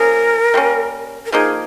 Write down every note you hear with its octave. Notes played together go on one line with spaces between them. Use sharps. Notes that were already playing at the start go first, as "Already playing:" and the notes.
Already playing: F3 A#3 C#4 G#4 A#4
G3 A#3 C#4
A#4
F3 A#3 D#4 G#4